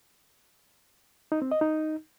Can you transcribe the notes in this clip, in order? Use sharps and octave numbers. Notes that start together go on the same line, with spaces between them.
D#4
C4
D#5
D#4